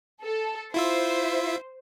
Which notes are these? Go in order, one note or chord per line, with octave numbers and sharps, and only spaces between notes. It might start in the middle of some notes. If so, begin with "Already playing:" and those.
A4
E4 F4 C5 E5